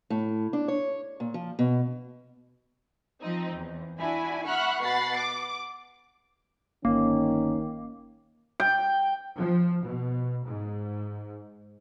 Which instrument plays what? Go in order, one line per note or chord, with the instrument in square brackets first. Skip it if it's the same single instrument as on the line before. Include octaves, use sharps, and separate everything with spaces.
[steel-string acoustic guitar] A2
D4
C#5
A#2
F3
B2
[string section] F3 C4 D#4
E2
D4 E4 F#4 G#5
E5 F#5 B5 C#6 F6 F#6
B2 F#5 B5 A6 C7
D6
[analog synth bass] G1 [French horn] D#3 [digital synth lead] A#3 [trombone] C#4
[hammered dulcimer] G5
[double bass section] F3
B2
G#2